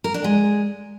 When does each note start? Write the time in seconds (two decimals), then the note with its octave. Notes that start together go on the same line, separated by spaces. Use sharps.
0.04 A#4
0.14 D4
0.24 G#3